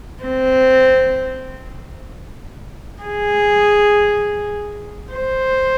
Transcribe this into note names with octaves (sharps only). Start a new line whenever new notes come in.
C4
G#4
C5